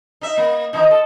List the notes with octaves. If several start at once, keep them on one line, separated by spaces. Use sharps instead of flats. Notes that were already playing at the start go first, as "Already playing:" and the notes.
D#4 E5
A#3
D#3 E3 D#4
A4